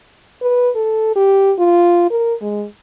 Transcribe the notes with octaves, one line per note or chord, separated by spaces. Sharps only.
B4
A4
G4
F4
A#4
G#3